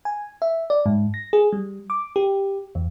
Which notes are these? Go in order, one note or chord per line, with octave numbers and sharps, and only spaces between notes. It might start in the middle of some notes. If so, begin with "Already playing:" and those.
G#5
E5
D5
G#2
A#6
G#4
G3
D6
G4
E2